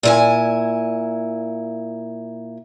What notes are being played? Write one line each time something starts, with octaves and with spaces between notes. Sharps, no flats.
A#2 E4 G#5